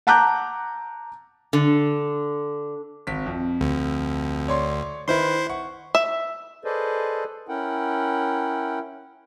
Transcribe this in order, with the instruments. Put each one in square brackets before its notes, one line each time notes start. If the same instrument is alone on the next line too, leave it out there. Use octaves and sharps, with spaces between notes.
[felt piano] F#5 A5 A#5 D6 F#6 G6
[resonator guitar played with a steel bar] D3
[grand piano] G#1 B6
F2
[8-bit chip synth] D2
[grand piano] C#5 D5 C6
[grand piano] D#3 B4 [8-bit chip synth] E4 C5 C6
[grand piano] F#5 C#6
[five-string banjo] E5
[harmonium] G#4 A4 B4 C5 D5 D#5
C#4 E4 A#4 F#5 G5